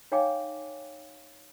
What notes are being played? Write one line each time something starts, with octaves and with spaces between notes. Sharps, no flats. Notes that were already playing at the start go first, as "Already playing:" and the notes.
D#4 C#5 F5 G5 G#5 D6